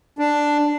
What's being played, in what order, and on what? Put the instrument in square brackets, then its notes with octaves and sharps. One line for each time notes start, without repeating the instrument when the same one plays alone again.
[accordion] D4